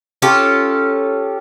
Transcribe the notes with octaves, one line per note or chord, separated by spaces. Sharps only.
C#4 F4 G4 A4